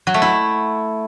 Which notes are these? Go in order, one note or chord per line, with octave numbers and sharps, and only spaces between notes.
F#3
A3
E4